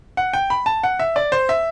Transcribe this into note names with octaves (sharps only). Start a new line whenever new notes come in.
F#5
G5
B5
A5
F#5
E5
D5
C5
E5